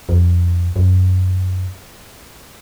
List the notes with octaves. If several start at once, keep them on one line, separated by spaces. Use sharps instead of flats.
F2
F#2